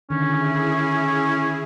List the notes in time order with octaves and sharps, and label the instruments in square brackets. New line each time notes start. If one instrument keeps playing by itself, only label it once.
[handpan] D3 D#3 [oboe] C#4 [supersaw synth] E4 G#4